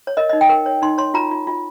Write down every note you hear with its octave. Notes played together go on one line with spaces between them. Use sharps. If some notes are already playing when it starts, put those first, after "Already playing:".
C#5
A#4 D#5
D#4 D#5
G5
A#4
C#5
D#4 C6
C#5 C6
F4 A#5
F4
F4